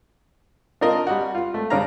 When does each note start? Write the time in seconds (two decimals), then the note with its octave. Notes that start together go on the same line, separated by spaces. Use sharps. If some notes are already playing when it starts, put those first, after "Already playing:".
0.81 D4 F4 A#4 D#5
1.07 G3 F#4
1.35 F4
1.54 A3
1.70 G2 C#3 D4 F5 A#5